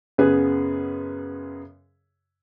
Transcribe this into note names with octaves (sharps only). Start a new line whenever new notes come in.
F#2 C#3 B3 G#4 B4